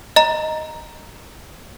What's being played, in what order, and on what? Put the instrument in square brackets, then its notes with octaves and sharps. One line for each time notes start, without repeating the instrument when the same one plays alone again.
[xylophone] D#5 A#5